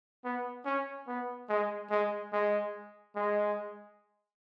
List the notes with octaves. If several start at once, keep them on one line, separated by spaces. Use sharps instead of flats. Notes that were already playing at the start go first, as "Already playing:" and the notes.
B3
C#4
B3
G#3
G#3
G#3
G#3